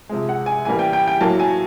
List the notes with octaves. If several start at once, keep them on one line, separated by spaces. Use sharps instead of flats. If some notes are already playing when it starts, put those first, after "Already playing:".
C3 F3 G#3
F#5
G#5
A2 E3 G3 A#3 G#5
G5
G5
G5
A2 F#3 A#3 A5
G#5